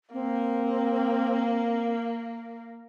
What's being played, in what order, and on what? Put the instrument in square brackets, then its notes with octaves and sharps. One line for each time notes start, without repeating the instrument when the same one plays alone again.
[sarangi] A#3 [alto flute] C4